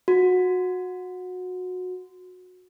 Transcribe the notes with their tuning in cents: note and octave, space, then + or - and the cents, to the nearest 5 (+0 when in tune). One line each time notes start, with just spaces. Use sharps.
F#4 -20